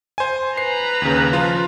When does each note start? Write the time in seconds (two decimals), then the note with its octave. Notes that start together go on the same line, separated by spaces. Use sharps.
0.18 C5 G#5
0.57 B4 A#5 C7
1.02 D#2 C#3
1.33 F3 F4